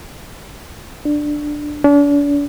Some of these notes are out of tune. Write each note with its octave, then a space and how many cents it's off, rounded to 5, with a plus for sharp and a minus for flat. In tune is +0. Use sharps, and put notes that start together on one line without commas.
D4 +10
D4 -40